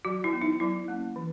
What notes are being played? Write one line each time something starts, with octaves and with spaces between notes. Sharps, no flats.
F#3 F#4
E4
B3
D#4
F#3 E4
A#3 C#4
E3